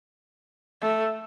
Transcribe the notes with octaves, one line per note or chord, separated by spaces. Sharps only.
A3